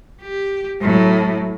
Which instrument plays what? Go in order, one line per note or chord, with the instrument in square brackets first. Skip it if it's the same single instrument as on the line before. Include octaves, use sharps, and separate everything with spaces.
[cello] G4
A2 F#3